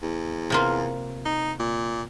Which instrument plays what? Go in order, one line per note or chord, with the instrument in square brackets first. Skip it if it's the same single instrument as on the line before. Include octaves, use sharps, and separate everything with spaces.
[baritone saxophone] E2
[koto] C3 A#3 F4
[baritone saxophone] D#4
A#2